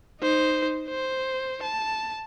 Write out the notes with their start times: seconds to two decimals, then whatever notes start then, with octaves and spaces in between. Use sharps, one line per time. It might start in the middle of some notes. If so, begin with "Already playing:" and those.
0.21 D#4 C5
0.89 C5
1.63 A5